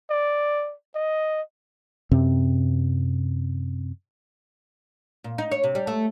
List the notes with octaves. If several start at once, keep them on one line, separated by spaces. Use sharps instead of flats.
D5
D#5
F#2 C3 C4
A#2
D#4
C#5
C3
G3
A3